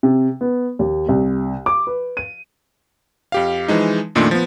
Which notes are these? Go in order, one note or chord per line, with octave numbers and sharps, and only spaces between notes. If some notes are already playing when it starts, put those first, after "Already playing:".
C3
B3
D#2
C2
D6
B4
D#7
F2 G4 F5
E3 F3 G#3 D#4
F2 A#2 D#3 A3 D4 C6
F3 B3